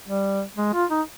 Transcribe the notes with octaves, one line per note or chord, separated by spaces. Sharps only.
G3
G#3
F4
D#4